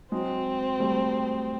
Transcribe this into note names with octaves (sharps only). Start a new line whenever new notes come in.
F#3 G#3 C4
G3 A3